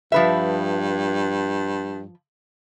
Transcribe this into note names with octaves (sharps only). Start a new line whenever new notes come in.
G2 F3 B4 E5